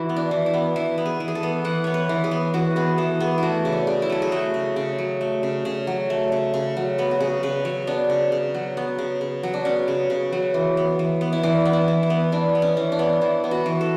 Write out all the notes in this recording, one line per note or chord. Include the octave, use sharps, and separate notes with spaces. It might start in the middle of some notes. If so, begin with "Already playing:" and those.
Already playing: E3 E4 F#4
B3
D4
E3
E4
B3
E3 E4
B3
G#4
E3
G#4
A4
B3
E3 F#5
B3 C#5
B4
E3
G#4
B3
E3 F#4
B3 G#4
E3 A4
B3 G#4
A3 E4 F#4
C#3
D4
C#3
E4
F#3 A4
G#4
A3 F#4
C#3
C#3
F#3
A3
C#3
C#3
F#3
A3
C#3
C#3
F#3
B3 B4
F#4
C#3 G#4
C#3 B4
F#3 C#5
B3 D4
C#3
C#3
F#3
B3
C#3
C#3
F#3
D4
B3 C#4
C#3
C#3
F#3
E3
B3
E3
B3
E4
E3 D4
B3
E4
E3
E4
B3
E3 D4
B3
C#4
E3
D4
B3
E3 E4
B3
F#4
E3
A4